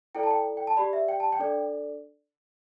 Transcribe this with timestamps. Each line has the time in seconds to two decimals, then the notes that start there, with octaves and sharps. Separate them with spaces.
0.15 E4 A4 D5 G5
0.23 A5
0.31 G5
0.57 G5
0.67 A5
0.77 G4 D5 B5
0.93 E5
1.08 G5
1.20 A5
1.32 G5
1.39 D4 A4 D5